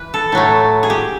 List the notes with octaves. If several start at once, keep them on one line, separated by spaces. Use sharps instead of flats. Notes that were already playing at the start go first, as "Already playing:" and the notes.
Already playing: E3 B4
A4
A2 F#3 A3
G#4
G4